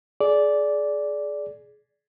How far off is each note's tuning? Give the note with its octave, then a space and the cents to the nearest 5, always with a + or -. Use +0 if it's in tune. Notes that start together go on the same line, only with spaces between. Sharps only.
G#4 +25 D5 -10